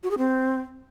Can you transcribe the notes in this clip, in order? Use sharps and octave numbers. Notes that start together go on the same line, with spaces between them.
F#4
G#4
C4